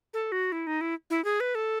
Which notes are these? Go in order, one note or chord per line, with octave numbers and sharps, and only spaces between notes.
A4
F#4
E4
D#4
E4
E4
G#4
B4
A4